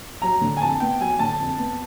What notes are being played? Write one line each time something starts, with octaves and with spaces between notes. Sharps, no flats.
F#3 A#5
D3
G#5
F2 A5
B3 G5
F#3 G#5
D3 A5
F2
B3